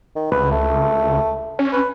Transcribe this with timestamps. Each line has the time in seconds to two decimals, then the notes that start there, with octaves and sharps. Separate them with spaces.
0.16 D#3
0.32 C#2 B4
0.51 A3
1.59 C#4
1.72 B4